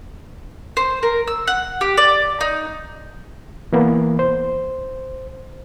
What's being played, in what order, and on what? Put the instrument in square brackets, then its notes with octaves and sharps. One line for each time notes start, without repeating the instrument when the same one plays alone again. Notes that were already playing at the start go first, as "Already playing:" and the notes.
[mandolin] C5
A#4
E6
F#5
G4
D5
D#4
[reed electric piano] E3 A#3 B3
C5